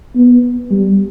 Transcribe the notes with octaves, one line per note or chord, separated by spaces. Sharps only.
B3
G3